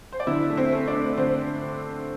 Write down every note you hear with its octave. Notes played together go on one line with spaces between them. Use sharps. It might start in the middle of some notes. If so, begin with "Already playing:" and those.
C5
D5
D3 E4 E5
A3
C4 C5
A3
D4 D5
C4
D3 C4 C5